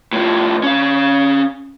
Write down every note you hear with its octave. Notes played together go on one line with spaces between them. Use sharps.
A2 F3
C#4 F5